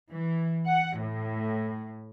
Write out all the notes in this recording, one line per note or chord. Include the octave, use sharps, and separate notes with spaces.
E3
F#5
A2